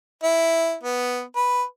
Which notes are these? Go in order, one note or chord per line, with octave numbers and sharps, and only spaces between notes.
E4
B3
B4